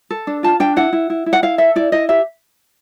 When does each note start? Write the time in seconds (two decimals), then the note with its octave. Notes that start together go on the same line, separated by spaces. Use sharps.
0.10 A4
0.27 D4
0.43 F4 A5
0.60 D4 G5
0.76 E4 F#5
0.93 E4
1.10 E4
1.26 E4
1.33 F#5
1.43 E4 F5
1.58 A4 E5
1.76 E4 D5
1.92 E4 D#5
2.09 G4 E5